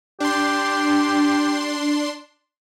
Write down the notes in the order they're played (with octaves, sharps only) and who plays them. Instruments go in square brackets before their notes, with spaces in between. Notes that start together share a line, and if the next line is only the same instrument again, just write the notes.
[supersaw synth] D4 C6 [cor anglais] G4